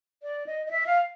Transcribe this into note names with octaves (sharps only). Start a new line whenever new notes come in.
D5
D#5
D#5
E5
F5